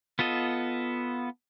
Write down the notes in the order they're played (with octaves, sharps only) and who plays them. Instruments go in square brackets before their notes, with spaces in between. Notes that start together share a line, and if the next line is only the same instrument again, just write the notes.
[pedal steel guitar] B3 F4 A4 D#5